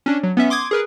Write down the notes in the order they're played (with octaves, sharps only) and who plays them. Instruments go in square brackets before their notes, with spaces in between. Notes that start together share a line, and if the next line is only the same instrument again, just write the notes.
[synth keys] C#4 D4
F#3
B3 C#4 E5
C6 D6 D#6 G#6
G#4 A#4 B4